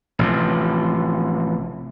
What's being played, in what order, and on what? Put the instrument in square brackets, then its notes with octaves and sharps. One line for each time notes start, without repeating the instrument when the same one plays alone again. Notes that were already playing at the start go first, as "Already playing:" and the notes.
[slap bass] A1 C3 F3